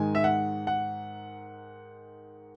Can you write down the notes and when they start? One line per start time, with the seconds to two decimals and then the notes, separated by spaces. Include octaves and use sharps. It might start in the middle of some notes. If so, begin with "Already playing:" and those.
Already playing: G#2 D#3 G#3 G#5
0.15 E5
0.24 F#5
0.67 F#5